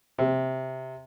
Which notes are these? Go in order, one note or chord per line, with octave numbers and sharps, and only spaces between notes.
C3